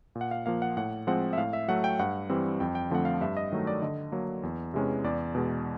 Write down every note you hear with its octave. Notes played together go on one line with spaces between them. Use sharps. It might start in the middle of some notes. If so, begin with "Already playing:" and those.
A#2
F#5
F5
F3 A#3 F5
F#5
A2 F#5
F3 G#3 C4 F#5
E5
A2 F5
E5
F#3 A3 F#5
G5
G2 F#5
E3 G3 C4
F2 G5
G5
D3 F3 A3 C4 F#5
F5
G2 E5
D#5
D#3 F#3 A3
D5
D3 D#5
F#3 A#3
E2
C3 E3 G#3 C#4
E2 D5
B2 G#3